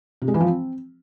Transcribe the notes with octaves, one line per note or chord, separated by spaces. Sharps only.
C3
G#3
E3
F3
C4